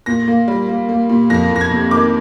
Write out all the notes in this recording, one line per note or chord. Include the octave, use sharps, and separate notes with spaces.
A#2 A#6
A#3
G3
A#3
A#3
A#2
F2 A#6
F2 A#6
G#6
C3
D#3 D6